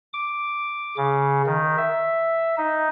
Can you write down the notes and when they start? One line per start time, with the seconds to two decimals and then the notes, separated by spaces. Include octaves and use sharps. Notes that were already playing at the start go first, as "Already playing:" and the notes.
0.14 D6
0.97 C#3
1.46 D#3
1.78 E5
2.58 D#4